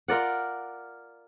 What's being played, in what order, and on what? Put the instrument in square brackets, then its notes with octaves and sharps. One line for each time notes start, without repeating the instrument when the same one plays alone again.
[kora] F4 A#4 D5 F#5